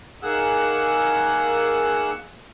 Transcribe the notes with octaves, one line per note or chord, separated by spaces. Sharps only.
D#3 A#3 G#4 F#5 E6